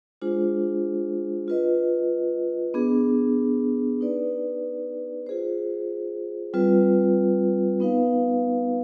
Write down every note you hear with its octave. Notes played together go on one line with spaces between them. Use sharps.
G#3 D4 F4 G#4 C5
F4 B4 D#5
B3 D4 G#4
D#4 B4 D5
F4 G#4 C5
G3 C4 F4 B4
B3 D#4 B4 F5